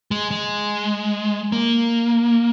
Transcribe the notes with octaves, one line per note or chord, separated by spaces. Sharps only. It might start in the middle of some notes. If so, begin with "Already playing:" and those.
G#3
G#3
A#3